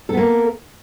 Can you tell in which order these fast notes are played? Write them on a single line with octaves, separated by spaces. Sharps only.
A4 B3 A#3